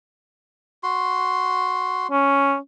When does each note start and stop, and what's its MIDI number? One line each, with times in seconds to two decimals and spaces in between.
0.83 2.07 66
0.83 2.07 84
2.11 2.57 61